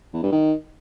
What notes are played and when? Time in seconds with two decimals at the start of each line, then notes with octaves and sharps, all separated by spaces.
0.13 E2
0.23 G2
0.32 D#3